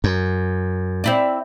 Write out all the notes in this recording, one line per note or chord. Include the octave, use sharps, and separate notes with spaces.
F#2
C4 E4 D5